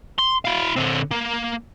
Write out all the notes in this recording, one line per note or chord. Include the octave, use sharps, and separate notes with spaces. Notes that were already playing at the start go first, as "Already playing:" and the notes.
C6
E4 F5
D3 C4
A#3